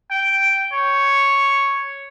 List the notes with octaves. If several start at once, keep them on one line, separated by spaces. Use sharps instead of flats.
G5
C#5